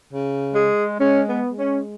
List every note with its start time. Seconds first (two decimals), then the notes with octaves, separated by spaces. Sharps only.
0.10 C#3
0.55 G#3 G#4
0.99 G#3 C#4
1.30 B3
1.44 G#3
1.59 C#4